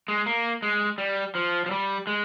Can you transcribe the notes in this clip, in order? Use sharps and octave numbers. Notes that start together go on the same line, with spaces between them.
G#3
A#3
G#3
G3
F3
F3
G3
G#3